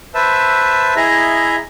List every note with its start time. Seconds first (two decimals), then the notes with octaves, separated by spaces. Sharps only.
0.14 B4 C5 E5 A5 E6
0.96 E4 G#4 D#5 E5 A#5